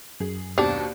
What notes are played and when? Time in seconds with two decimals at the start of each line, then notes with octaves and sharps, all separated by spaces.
0.20 F#2 G#4
0.58 D#2 B2 C4 D4 G4 A5